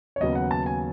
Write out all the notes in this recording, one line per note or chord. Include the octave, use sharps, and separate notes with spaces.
C#5
D#2 C#3 F#3 B3 D#5
F#5
A5
G#5